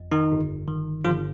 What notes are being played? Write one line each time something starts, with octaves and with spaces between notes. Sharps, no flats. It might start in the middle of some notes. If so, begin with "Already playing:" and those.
Already playing: G1 F2
D#3 D#4
G1
D#3
G1 F3 F4